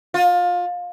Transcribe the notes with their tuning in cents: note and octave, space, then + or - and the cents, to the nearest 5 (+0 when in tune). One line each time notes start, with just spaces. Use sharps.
F4 +25